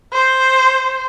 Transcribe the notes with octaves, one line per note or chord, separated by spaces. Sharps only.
C5